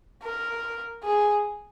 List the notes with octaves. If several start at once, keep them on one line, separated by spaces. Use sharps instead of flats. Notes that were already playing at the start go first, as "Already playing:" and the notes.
A#4
G#4